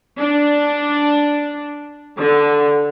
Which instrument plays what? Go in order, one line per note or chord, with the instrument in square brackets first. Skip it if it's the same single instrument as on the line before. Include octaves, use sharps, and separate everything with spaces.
[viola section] D4
D3